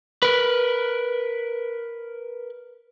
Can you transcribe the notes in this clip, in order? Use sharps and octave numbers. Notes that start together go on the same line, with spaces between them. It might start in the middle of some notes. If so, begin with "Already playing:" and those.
A#4 B4